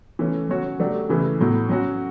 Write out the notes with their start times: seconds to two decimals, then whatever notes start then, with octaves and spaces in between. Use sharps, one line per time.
0.19 E3 A3 C#4
0.49 F#3 C#4 F#4 C#5
0.80 F#3 A3 D4 G4
1.09 C#3 E3 A3 E4
1.39 A2 F#3 B3
1.69 F#3 C#4 F#4